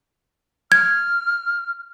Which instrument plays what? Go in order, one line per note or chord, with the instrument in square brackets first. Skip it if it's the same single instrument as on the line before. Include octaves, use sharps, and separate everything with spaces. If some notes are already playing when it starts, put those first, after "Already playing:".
[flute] F6 [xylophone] G#6